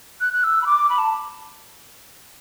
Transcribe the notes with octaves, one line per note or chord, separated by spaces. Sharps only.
F#6
F#6
E6
B5
D6
B5
A5